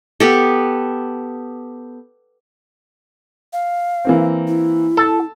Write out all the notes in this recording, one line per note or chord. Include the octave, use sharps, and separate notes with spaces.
B3 G4 A4
F5
E3 A#3 C4
E4
A4 A5 E6